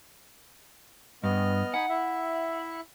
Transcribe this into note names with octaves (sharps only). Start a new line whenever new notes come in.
G2 B3 D#5 F6
D#4 F#5 G#5 B5
E4 E5